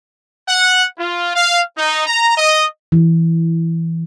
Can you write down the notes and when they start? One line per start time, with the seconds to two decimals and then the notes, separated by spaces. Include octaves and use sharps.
0.48 F#5
0.99 F4
1.36 F5
1.78 D#4
2.07 A#5
2.38 D#5
2.92 E3